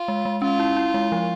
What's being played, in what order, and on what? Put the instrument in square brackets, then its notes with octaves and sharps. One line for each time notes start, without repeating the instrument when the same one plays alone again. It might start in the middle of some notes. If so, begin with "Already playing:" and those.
Already playing: [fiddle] F4
[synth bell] G#3
G#3
[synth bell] C#4 [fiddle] F4
[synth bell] E4
E4
G#3
F3